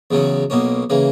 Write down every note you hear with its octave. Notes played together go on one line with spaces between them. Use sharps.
E2 C#3 F#3 C#4
B1 B2 A#3 C#4
C#3 E3 A#3